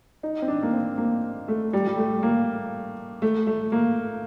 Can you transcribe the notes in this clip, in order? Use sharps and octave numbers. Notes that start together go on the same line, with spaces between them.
D#4
C4
D4
A#3
C4
A#3
A3
G3
G3
A3
A#3
A3
A3
A#3